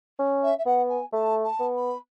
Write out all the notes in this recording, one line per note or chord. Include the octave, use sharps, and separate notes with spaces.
C#4
E5
E5
B3 F#5
G#5
A3 A5
A5
B3
B5